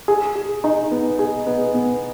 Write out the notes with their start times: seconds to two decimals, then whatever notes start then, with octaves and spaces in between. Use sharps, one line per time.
0.08 G#4
0.36 G#4
0.64 D#4
0.91 B3
1.19 G#4
1.46 B3
1.74 B3